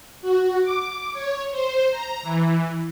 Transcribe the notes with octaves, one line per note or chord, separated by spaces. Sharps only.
F#4
D6
C#5
C5
A#5
E3